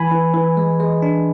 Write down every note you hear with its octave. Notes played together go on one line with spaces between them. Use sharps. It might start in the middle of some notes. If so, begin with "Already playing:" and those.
Already playing: E3 G#5 B5
E3
E3
G#3
G#3
D4